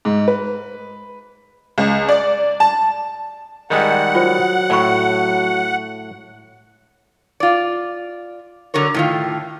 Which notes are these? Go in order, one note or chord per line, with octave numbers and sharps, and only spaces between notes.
G#2
B4
C#2
D5
A5
D#3 G3 G#3 F#5
F#3 F4 C5
A2 D5 B5 C#6
F4 D5
D3 F#3 A#4 C#5
A2 D#3 F4